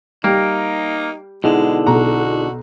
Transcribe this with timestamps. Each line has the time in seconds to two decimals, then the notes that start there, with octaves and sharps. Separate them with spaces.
0.24 G3 A#3 D#4
1.44 B2 D3 G#3 D#4 E4 G#4
1.87 B1 F#4 A#5